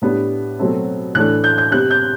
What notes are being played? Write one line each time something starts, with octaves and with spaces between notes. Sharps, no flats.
A2 G3 B3 D4
B2 F#3 A3 C4
A2 E3 A3 D4 F#6
G6
G6
C3 G3 B3 F#6
G6